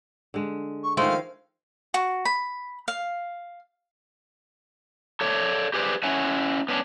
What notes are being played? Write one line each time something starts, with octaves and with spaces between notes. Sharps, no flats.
D3 G#3
C#6
D#3 F3 G#3 A3 F5
F#4
B5
F5
A4 C#5 D5
G4 G#4 B4 C5 D5
C#4 E4 F#5 G#5
B3 C#4 D4